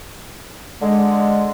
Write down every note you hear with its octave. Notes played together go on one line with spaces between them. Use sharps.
D3 G#3